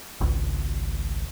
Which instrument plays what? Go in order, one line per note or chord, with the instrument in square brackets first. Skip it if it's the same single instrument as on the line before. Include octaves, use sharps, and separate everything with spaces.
[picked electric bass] G#1 C#2